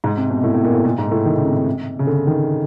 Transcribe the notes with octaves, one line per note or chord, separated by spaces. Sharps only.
G#2
C3
B2
A2
A2
A#2
A2
A#2
G#2
A2
D#3
C#3
C3
C3
C#3
D3
D#3